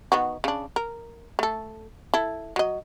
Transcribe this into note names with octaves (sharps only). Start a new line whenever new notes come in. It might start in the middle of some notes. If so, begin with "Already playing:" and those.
D#3 B3 F#4
C#3 D4
A#4
A3 A4
E4 A4
F#3 D#5